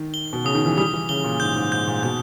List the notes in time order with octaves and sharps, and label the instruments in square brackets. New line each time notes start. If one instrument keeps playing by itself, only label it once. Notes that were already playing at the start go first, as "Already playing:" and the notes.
Already playing: [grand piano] D#3
[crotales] G7
[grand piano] B2
[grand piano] C#3 [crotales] D#6
[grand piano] D#3
E3
[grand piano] G3 [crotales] D#6
[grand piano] E3
[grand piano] C#3 [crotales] G7
[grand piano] A#2
[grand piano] G#2 [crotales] G6
[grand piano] G#2
[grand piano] G#2 [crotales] G6
[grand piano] A#2
[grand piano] B2 [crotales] G6